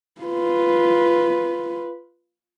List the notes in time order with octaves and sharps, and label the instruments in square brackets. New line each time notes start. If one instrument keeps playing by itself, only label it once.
[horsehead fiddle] F4 B4